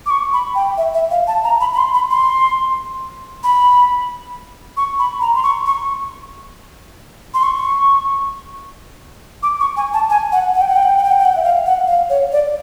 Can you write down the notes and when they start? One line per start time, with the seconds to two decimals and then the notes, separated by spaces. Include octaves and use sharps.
0.06 D6
0.10 C#6
0.33 B5
0.55 G5
0.78 E5
0.94 E5
1.11 F5
1.27 A5
1.44 A#5
1.61 B5
1.73 B5
1.77 C6
1.94 B5
2.11 C6
3.44 B5
4.77 C#6
4.99 B5
5.21 A#5
5.35 C6
5.43 C#6
5.66 C#6
7.34 C6
7.43 C#6
9.43 D6
9.60 C#6
9.77 G#5
9.94 A5
10.10 G#5
10.32 F#5
10.55 F#5
10.61 G5
10.68 F#5
10.76 G5
10.83 F#5
10.89 G5
10.97 F#5
11.04 G5
11.12 F#5
11.19 G5
11.25 F#5
11.36 E5
11.43 F5
11.66 F#5
11.87 F5
12.10 C#5
12.32 D5